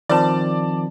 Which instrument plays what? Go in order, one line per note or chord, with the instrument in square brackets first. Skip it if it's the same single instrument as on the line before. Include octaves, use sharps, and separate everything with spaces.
[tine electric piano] D#3 F3 C4 [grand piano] D5 A5